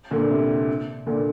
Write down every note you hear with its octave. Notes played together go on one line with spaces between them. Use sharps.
A#2 D3
C3
A#2 D3